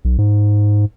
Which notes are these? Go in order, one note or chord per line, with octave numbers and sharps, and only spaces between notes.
B1
G#2